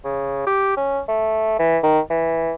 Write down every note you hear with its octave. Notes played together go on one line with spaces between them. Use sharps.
C#3
G4
C#4
A3
E3
D#3
E3